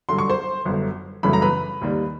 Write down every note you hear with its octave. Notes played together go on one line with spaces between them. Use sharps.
G2 D3 F#3 C6
C#6
C5 C6
G1 F#2 D3
G1 F#2 C#3 E3 A3 B5
A#5
B4 B5
D#2 D#3 G3